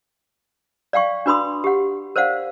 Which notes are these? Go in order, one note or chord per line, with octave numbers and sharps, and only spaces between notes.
D5 F5 G5 C#6
D4 F#4 B4 B5 C6 D#6
G4 F#5
A#4 C5 D5 F5 F#5